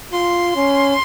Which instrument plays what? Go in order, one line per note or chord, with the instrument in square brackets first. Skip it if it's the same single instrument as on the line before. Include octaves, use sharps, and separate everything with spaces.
[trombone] F4 [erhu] C6
[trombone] C#4